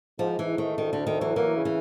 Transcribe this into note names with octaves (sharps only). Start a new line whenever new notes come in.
G#2 F3
G#2 E3
D#3 A3
D2 D#3
D2 D3
D#3
E3 F#3
E3 A#3
C#3
E3